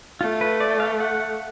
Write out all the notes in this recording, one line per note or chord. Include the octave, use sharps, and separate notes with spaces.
A3 F4
B4
D5
F5
F#5